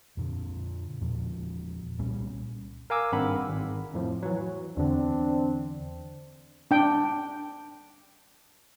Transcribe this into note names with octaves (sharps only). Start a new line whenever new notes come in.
F2 A#2 D3
E2 A#2 F3
C2 A#2 G3 C#4
A#4 F5 G#5 D6 E6
G#1 G2 C4 A#4 F#5 B5
G#1
F2 A2 F3
E3 F#3
E2 D3 C4 D4
D4 G5